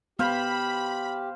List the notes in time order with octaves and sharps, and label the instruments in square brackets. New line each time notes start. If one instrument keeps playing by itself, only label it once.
[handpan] B3 [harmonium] G4 [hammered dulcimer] C5 F5 [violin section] B5